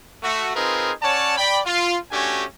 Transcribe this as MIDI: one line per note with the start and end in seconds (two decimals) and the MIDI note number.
0.23 0.52 57
0.23 0.52 66
0.55 0.92 60
0.55 0.92 63
0.55 0.92 65
0.55 0.92 68
0.55 0.92 70
0.55 0.92 71
1.02 1.36 61
1.02 1.36 73
1.02 1.36 74
1.02 1.36 78
1.02 1.36 81
1.37 1.60 74
1.37 1.60 79
1.37 1.60 83
1.66 1.96 65
2.11 2.44 57
2.11 2.44 61
2.11 2.44 62
2.11 2.44 66
2.11 2.44 67
2.11 2.44 80